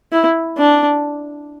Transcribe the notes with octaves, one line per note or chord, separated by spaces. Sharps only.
E4
D4